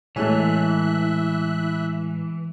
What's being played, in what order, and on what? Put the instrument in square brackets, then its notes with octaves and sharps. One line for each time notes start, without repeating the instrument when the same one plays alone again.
[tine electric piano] A2 G#3 G#5 [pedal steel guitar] E3 [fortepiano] A3 C#5 [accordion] E5 F#6